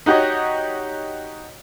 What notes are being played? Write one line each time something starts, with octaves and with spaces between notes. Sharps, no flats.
D#4 F#4 G4 C#5 D#5